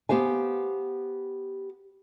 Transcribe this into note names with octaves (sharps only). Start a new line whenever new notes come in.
B3 G4 C5 F5 G#5